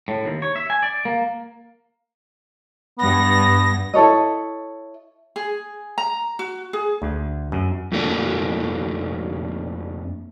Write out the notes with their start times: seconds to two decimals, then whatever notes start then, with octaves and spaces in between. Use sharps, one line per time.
0.08 A2
0.25 D#2
0.42 C#5
0.56 E5
0.70 G#5
0.83 D5
1.05 A#3
2.98 G2 B3 A#6
3.94 E4 A4 C#5 D#5
5.36 G#4
5.98 A#5
6.39 F#4
6.73 G#4
7.02 D2
7.52 F#2
7.92 F2 A3 A#3 D4